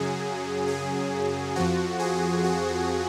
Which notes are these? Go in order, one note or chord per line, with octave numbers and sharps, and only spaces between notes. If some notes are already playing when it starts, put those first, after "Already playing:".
Already playing: F#2 C#3 F#3 G#4
G#4
F2 F3 F#4
G#4
F#4